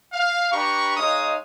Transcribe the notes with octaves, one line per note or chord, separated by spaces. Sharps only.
F5
D4 G4 B4 A#5 C#6
G#3 D#4 C#5 F5 D#6